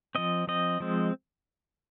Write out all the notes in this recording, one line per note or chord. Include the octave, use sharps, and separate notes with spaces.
F3 C4 D#5
F3 C4 D#5
F3 G#3 C4